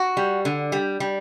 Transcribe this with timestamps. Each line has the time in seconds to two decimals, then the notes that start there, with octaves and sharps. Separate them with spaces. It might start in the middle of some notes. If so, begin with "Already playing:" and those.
Already playing: F#4
0.17 G3
0.45 D3
0.72 G3
1.00 G3